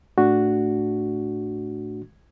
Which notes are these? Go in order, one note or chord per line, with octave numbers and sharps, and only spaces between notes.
A2 A3 D4 F#4